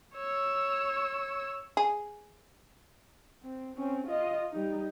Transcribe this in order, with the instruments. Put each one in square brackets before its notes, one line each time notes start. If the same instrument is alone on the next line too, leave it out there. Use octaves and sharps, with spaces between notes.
[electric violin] C#5 E6
[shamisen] G#4
[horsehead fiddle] C4
C4 C#4
F4 D#5
G3 D#4